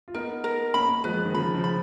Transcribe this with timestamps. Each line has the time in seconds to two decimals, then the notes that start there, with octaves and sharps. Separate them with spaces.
0.08 F4
0.14 B3 D#4 A#4
0.44 A#4
0.74 A#3 C#4 B5
1.04 F3 G#3 B4
1.25 D#3
1.34 C#3 F3 B5
1.54 C#3 F3
1.64 B5